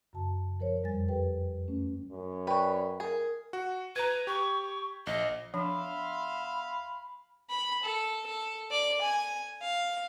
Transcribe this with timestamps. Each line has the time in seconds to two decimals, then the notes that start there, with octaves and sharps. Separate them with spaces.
0.13 F#2 C#3 F#4 A5
0.60 F3 A#4 C5 C#5
0.83 F2 G3 G#5 A6
1.08 G4 A4 B4 G5
1.68 A3 C#4
2.11 F#2
2.47 B4 D5 G5 C#6
3.00 G#4 A#4
3.53 F#4
3.96 B4 A#5 G#6
4.27 G4 C#6
5.07 A#1 D#5
5.54 E2 F3 D4 E5 F5 B5 C6
7.50 B5
7.84 A4
8.26 A4
8.71 D5
9.01 G#5
9.62 F5